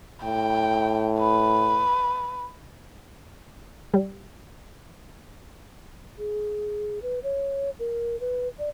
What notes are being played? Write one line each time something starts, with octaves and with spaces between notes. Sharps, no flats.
A2 G5
B4
G3
G#4
B4
C#5
A#4
B4
D5